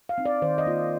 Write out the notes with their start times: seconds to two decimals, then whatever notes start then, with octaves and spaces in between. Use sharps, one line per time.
0.09 F5
0.18 C4 D#4
0.26 D5
0.42 D#3 C5
0.58 D#5
0.66 A#3 F4